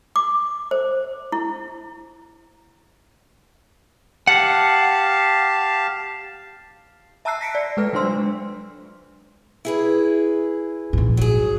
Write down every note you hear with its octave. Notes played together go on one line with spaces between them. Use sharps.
D6
C5
E4
G4 F5 F#5 A5
E5 A5 A#5 E6 F#6 C7
A#6 B6 C#7 D7
D5
G#3 A4 B4 F6
F#3 G#3 D4 C5 C6 E6
E4 G#4 B4
A#1 G#2
F#3 G#4